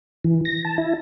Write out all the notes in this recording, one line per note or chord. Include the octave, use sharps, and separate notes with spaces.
E3
A#6
A5
E4